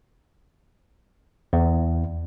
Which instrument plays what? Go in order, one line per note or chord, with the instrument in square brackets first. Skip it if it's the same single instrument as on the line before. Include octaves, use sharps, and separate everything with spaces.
[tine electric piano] E2